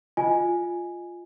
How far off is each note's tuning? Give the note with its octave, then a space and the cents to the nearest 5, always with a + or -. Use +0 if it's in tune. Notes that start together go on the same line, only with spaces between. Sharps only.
F4 +0 D#5 +0 G#5 +0